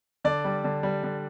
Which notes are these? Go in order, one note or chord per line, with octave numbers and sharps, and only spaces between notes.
D3 D5
G3
D3
G3
D3